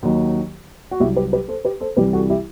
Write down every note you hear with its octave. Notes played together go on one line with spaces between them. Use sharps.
D#2 D#3 F#3
F#4
C2 C3 F#3 E4 G4
G4 B4
G4 B4
A4 C5
G4 B4
A4 C5
C2 C3 E3 G3 G4 B4
F#4 A4
E4 G4